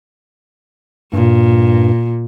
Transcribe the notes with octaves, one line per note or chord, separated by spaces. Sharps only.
G2 A#2